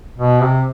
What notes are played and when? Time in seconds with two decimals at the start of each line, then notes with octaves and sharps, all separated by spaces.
0.18 B2
0.41 C3